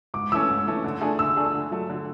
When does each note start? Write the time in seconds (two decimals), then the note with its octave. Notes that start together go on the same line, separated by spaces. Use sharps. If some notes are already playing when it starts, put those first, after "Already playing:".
0.14 G#2 D6
0.32 E3 A3 C#4 E6
0.48 G#2
0.67 E3 A3 C#4
0.84 D3
1.01 A3 D4 G#4
1.19 D3 E6
1.37 A3 D4 G#4
1.54 D3
1.71 F#3 A3
1.90 D3